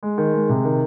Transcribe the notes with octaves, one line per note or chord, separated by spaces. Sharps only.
G#3
D#3
G#3
C3
D#3